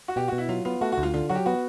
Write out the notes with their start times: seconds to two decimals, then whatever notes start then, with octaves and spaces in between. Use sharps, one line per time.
0.08 F#4
0.16 B2 G4
0.28 B2 F#4
0.38 E4
0.49 F#3 F4
0.65 B3 F4
0.81 A3 F#4
0.92 F#4
0.98 D2
1.03 F4
1.14 D3 F4
1.29 F#3 F#4
1.35 G4
1.46 B3 F#4